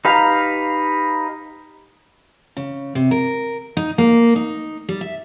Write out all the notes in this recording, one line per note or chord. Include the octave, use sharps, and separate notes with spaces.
D#4 G4 B4 F5 A#5
C#3
C3
A#4
D#4
A#3
D#4
G3
E5